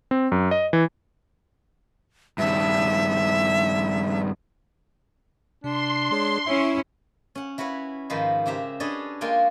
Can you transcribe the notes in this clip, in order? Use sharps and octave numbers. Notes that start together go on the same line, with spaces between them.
C4
F#2
D#5
E3
G2 D#3 E5
C3 D4 C6
G#3 G#4 C#5
C#4 E4 E5
C#4 F#5
E4 F#4 B4 C#5 F#5
G#2 D#3 F3 B4 C5 D#5
C#3 G4 C5 E5 A#5
D4 G#4 A4 B4 C#5 D#5
G#3 A#3 F4 A#4 G5 G#5